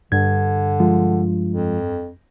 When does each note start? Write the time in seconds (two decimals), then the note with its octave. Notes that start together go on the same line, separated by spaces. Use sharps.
0.12 G2 D3 G#6
0.80 F3 G#3 F4
1.52 F2